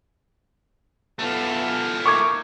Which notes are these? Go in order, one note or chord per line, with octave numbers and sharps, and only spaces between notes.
A3 B3 F4 A4
A#3 D#4 C#6 D6 G#6